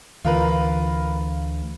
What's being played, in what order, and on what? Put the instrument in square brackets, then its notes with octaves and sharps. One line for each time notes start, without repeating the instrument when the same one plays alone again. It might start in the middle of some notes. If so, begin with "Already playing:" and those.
[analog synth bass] D2 [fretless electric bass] D3 E3 [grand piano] F4 A#4 B4